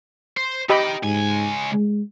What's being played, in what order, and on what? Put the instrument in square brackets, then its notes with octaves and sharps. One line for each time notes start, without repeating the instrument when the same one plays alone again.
[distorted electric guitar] C5
[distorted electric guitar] D#4 G5 [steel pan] G4 D#5 B5
[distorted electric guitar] C#2 G#5 [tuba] G#2
[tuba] G#3